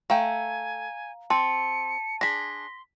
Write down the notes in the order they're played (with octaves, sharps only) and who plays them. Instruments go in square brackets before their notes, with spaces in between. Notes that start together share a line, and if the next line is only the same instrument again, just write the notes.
[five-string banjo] A3 G5 [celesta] F5 A#5 [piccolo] G#5
[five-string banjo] C4 [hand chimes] A5 [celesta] C6 [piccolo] C#7
[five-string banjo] D4 G#4 [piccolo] C6 [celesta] A#6 B6